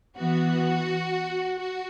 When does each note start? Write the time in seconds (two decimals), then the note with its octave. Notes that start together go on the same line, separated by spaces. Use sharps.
0.16 E3 B3 F#4
1.59 F#4